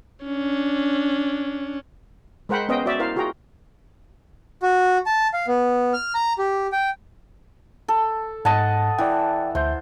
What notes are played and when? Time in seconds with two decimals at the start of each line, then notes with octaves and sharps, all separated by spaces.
0.25 C#4 D4
2.49 G#3 A#4 C5 F#5 G5 B5
2.69 B3 C#4 C5 D#5 F5 G5
2.86 F#4 C5 D5 E5
2.99 E4 A#4 C5 F5
3.16 F4 F#4 G#4 G5 A#5
4.63 F#4
5.06 A5
5.33 F5
5.47 B3
5.93 F6
6.15 A#5
6.38 G4
6.72 G5
7.88 A4
8.45 G#2 D#5 F#5 A5
8.98 E3 D5 G5
9.55 D2 C5 E5 G6